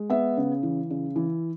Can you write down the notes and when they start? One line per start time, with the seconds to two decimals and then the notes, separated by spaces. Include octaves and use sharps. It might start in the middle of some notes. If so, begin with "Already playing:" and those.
Already playing: G#3
0.10 B3 E5
0.37 C#3
0.63 E3
0.90 C#3
1.16 E3